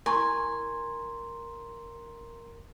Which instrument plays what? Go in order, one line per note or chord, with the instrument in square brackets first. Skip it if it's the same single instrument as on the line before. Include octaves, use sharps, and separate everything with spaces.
[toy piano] E4 C#6 [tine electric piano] A#4 A#5 [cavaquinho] G#5 [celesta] C6